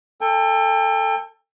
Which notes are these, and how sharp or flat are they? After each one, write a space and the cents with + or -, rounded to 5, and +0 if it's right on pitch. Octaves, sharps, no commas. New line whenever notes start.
A4 +15 G5 +40